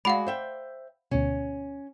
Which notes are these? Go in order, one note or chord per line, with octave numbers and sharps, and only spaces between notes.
G#3 F#4 D5 F5 F#5 B5
C5 E5 G5
D2 B2 C#4